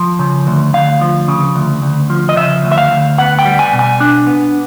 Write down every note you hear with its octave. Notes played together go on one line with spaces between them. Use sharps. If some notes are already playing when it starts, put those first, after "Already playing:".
Already playing: F3
C#3
D2
D2 F5
F3
C#3
D2
D2
F3
D#5
C#3 E5
D2
E5
F5
D2
B3 F#5
G5
G3
G#5
B2
G#5
D4
B3